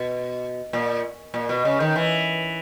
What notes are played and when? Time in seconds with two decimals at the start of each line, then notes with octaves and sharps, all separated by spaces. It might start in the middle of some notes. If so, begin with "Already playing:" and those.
Already playing: B2
0.73 A#2
1.34 A#2
1.49 B2
1.65 C#3
1.80 D#3
1.95 E3